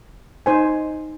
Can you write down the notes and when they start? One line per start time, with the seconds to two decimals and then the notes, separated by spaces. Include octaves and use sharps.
0.46 D#4 C5 G#5